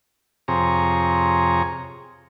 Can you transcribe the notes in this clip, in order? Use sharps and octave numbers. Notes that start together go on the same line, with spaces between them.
F2 C3 G#4 C#5 A#5